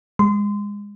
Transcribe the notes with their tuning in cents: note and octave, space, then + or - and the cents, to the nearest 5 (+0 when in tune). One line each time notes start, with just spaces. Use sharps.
G#3 -25 C6 -25